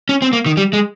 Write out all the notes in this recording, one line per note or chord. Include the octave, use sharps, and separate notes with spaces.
C#4
C4
A#3
D#3
G3
G#3